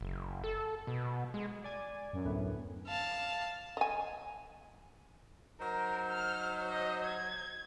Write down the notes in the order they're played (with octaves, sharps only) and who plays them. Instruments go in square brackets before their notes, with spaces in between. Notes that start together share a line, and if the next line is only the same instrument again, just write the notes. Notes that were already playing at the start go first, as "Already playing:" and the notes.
[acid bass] F#1
A4
B2
G#3
[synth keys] D5 G#5
[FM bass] F#2
[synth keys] D2 A2 B3
[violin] F5 A5
[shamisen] D#5 G#5
[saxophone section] F#3 D#4 C5 [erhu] A#4
[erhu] F6
D#5
G#6